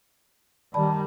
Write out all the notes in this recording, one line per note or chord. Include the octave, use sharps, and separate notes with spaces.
D#3 G3 D5 A5 B5